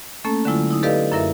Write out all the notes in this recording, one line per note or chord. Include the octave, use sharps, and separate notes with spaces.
A3 A#3 C#4 A4
D3 F#3 G#3 E4 F4
D#4 E4
G4 A4 B4 D5 D#5 F5
F#2 E4 A#4 E5